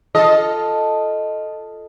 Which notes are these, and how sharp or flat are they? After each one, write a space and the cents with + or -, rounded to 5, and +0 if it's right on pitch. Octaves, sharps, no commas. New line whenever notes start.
F4 +0 A4 +0 D#5 +0